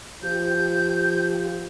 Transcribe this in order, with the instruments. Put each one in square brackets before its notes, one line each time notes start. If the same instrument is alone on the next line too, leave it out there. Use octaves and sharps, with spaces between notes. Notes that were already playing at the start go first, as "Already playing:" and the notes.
[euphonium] F3 [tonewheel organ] G4 [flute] G6